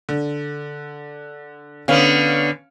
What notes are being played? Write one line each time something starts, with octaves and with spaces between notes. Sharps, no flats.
D3
D3 B3 C#4 F5